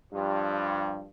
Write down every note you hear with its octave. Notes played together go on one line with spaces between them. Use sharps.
G2 F3